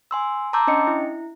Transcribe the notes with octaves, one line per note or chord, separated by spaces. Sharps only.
G#5 C6 E6
A5 A#5 C6 D6 E6 G6
C#4 D4 D#5 C#7
E4